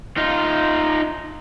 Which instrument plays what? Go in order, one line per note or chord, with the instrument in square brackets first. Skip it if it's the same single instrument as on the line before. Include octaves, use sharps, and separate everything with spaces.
[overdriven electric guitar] D#4 F4